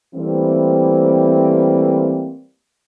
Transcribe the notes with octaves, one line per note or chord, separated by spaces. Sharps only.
E3 G3 A3 A#3 C4